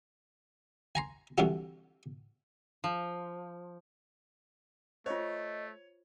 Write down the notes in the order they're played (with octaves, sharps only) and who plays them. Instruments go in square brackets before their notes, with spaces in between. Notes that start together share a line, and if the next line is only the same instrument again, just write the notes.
[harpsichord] G#5 A#5 C6
C2 D3 E3 F#4 G4
[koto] F3
[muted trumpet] A3 [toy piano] F4 C5 [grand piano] C#5 [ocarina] D#5